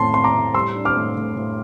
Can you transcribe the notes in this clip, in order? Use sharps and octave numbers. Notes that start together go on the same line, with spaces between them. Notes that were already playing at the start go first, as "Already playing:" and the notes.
Already playing: A2 C4 A5 C6
C4 C6
A#5 D6
A2
G3 C6 E6
D4
D6 F6
A2
A2
A2